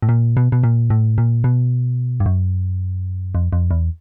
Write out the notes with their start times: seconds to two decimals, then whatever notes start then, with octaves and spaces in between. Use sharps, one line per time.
0.03 A2
0.09 A#2
0.37 B2
0.52 B2
0.64 A#2
0.90 A2
1.18 A#2
1.44 B2
2.20 G2
2.26 F#2
3.35 F2
3.53 F2
3.71 E2